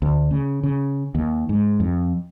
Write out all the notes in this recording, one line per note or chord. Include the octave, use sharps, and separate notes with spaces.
D2
C#3
C#3
D#2
G#2
F2